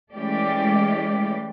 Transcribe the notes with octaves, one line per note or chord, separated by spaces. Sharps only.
E3 G#3 A3 C#4 G4 D5